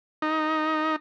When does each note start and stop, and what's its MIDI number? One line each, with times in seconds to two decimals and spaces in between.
0.22 0.96 63